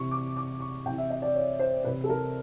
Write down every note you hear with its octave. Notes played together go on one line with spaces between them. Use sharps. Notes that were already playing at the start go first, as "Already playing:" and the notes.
Already playing: C3 E3 C#6
D6
D6
C#6
C3 E3 G5
E5
D#5
D5
C#5
C5
C3 E3 B4
A4
A#4